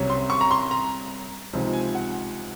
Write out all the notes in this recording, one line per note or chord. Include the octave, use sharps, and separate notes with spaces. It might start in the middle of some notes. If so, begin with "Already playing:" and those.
Already playing: C2 C3 F#3 C#4
C6
C#6
A#5
C6
A#5
C#2 C3 F3 C4 D#4
G#5
F#5